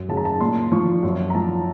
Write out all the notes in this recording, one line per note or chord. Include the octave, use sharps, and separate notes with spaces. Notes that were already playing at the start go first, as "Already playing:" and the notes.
Already playing: F#2
C#3 F#3 A5
A#5
A5
A#2 C6
F3 C#6
F#2
A#5
F3 A5